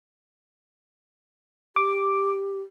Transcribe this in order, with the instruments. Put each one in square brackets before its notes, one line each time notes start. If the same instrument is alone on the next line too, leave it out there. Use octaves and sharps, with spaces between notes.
[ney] G4 [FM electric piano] D6